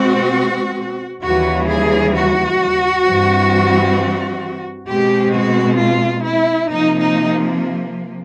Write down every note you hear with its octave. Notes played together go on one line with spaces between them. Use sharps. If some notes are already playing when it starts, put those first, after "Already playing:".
Already playing: B2 G#3 C4 F#4
D#2 C#3 E3 G3 F#4
G#4
F#4
G2 E3 G3 C4
B2 G#3 C4 G4
F#4
F4
E4
C3 F3 A#3 D#4
D#4